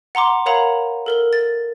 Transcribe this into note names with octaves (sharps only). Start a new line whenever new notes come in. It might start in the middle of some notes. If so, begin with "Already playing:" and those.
F#5 A#5 C6 D6
A#4 C#5 F5 F#5 A#5 B5
A4 A#4 G7
A6